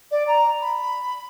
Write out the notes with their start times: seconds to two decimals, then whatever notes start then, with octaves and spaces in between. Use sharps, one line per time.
0.11 D5
0.27 A#5
0.62 B5